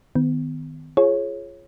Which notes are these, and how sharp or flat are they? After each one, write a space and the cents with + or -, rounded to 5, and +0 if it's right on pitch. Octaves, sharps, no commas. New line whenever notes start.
D#3 +0 B3 +30
F4 -15 G#4 +10 C#5 -20